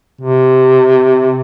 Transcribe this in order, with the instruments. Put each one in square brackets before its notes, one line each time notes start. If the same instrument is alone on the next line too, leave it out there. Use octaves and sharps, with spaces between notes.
[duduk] C3